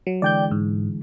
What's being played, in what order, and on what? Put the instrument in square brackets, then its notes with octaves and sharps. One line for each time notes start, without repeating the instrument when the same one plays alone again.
[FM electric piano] F#3
[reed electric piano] D3 E3 G#3 [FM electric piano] D5 G5 G6
[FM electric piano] G#2